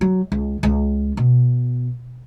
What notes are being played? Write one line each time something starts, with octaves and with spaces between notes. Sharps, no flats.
F#3
C#2
C#2
B2